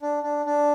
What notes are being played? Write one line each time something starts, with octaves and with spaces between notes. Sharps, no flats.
D4
D4
D4